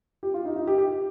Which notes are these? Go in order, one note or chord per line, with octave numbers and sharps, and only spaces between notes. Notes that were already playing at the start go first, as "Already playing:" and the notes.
G4
F4
D#4
D#4
G4
G4